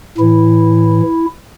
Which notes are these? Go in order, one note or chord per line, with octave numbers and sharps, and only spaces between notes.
A2 E3 E4